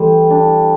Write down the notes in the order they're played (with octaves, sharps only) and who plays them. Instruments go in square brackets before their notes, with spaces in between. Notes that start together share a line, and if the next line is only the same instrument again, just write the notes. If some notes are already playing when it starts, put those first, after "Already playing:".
Already playing: [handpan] E3 [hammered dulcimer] G3 A3 C5
[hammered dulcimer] D4